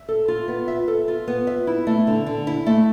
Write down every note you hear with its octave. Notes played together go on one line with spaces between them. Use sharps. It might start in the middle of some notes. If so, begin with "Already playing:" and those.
Already playing: E5
A4
F4
B3
E5
A4
F4
B3
E5
E4
A3
D3
D3
E4
A3